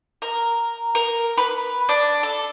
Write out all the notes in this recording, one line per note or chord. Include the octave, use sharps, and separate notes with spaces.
A#4
A#4
B4
D4
A4